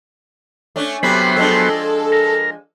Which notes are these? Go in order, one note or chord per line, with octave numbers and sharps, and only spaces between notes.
A3 C#4 D4
C3 F#3 G3 A3 B3 C5 B5
F3 G#3 D4 A4
A#4